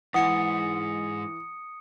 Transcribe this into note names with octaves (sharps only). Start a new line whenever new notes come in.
G#2 E3 F#5 D#6 C#7